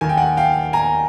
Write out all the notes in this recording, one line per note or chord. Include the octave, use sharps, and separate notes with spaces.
D#2 D#3 G#5
G5
F#5 G#5
F5 G5
G#5 A#5